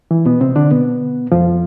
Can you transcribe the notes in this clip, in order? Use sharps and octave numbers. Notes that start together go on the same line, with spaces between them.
E3
B2 B3
C3 C4
D3 D4
B2 B3
F2 F3